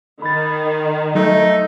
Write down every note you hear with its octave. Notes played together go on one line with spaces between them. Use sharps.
D#3 B5 A6
F#3 A3 D#4